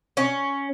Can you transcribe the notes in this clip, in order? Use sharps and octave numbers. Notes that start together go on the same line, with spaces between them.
C#4